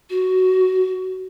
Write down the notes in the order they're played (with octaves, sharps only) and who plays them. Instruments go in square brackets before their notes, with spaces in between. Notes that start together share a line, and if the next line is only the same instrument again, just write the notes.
[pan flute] F#4